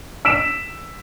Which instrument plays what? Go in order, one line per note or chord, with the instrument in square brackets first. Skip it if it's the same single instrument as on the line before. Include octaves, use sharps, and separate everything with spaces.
[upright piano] E6 B6 D7 E7